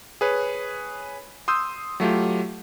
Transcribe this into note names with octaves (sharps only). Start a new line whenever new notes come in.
G#4 B4 C#5
C6 D#6 E6 G6
F#3 A3 F4 G4